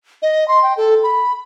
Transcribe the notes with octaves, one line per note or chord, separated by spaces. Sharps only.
D#5
C6
G5
A4
B5